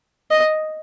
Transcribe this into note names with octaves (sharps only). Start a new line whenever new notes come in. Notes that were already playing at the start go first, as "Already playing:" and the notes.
D#5